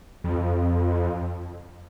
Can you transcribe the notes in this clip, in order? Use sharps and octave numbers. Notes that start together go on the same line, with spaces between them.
F2